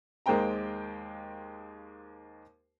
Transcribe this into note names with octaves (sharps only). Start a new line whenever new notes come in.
D#2 G#3 A#3 C5 G5 A#5